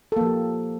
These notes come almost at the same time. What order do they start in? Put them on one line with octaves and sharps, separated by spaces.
A4 A#3 F3 G4